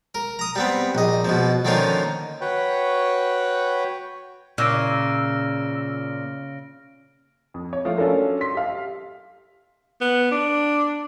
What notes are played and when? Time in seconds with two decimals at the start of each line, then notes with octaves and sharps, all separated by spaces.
0.15 A#4
0.39 A#5 D#6
0.56 G3 B3 C4
0.95 A#1 D#5
1.25 B2 F3
1.65 D3 D#3 F3 A#3 C#4 F4
2.41 F#4 B4 C#5 G5
4.58 A#2 C#3 E6 F6 A#6 D7
7.54 F2
7.73 C#5
7.85 F3 A3 F4
7.98 F#3 C#4 D4 F4 A4 A#4
8.41 C6 B6
8.55 G4 F5
10.01 B3
10.31 D4